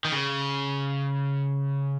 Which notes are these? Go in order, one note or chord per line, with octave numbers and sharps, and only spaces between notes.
D#3
C#3